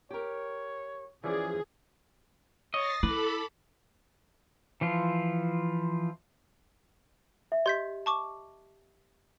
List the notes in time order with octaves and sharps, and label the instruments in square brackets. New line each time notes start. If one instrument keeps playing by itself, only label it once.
[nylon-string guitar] G4 A#4 [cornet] C#5
[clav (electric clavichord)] E3 F3 C#4 [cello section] G#4 [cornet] D5
[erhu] C#5 [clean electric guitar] D#5 [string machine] A6 A#6 C7
[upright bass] E4 [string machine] A4 B5 [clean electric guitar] B4 [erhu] D6
[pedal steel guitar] E3 F3 F4
[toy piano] E5
[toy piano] G4 D#5 [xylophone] C6 G6 B6
[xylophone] A5 C#6 D6